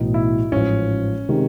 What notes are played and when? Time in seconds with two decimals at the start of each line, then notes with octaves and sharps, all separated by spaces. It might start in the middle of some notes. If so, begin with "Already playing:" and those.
Already playing: B1 A2 E3 D#4
0.14 E4
0.52 A1 G#2 F3 C#4
1.29 C3 D#3 G#3